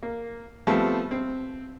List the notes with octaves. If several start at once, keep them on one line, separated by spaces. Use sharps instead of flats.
A#3
F3 G3 A3 B3 C4
C4